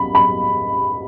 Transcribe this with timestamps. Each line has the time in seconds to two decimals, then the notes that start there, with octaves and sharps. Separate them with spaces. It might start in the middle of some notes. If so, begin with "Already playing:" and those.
Already playing: B5
0.15 B5